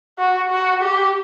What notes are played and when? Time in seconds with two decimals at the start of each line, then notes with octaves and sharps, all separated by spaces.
0.19 F#4
0.51 F#4
0.83 G4